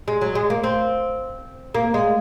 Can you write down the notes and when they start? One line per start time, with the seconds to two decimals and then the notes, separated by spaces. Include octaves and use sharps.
0.08 G#3
0.21 F#3
0.35 G#3
0.50 A#3
0.64 C4
1.75 A#3
1.94 G#3